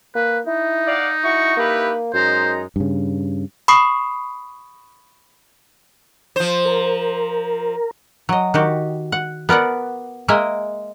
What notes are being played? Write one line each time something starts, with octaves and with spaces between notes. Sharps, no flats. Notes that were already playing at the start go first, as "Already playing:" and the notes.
A#3 B4
D#4 E4
D5 F5 F#5
E4 F#4 C#6
A#3 E4 G4 B4
F#2 G#3 D#4 C5 A#5
G2 C#3
B5 C#6 D#6 C7
F3 C5
A#4
F#3 D#5
D#3 F#4 G4
F#5
B3 A#4 D5 F#5
G#3 A#3 A#4 D#5 E5 G#5